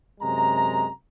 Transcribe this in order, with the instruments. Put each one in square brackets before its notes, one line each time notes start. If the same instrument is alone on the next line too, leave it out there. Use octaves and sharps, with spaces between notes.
[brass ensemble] F#2 C3 G#3 A#5